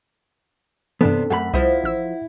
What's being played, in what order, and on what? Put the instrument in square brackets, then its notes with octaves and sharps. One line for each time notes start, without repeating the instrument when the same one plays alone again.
[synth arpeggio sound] G2 E3 [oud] C3 [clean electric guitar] B3 D4 [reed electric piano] A4
[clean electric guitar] F#2 G#4 B5 [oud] A3 [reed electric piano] F#5
[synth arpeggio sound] C2 [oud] F3 C5 D#5 [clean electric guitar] E4
[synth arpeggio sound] A1 E6